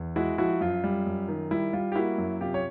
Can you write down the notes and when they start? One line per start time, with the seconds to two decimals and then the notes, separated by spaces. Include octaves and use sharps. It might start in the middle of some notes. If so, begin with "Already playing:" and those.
Already playing: E2
0.16 G#3 E4 F#4
0.38 F3 E4 F#4
0.61 F#2 F4
0.84 G3
1.06 F#2
1.28 D#3
1.51 G3 E4
1.73 G3 F4
1.92 G4
1.95 A#3 E4 F#4
2.18 F#2
2.40 C3 F4 G4
2.54 C#5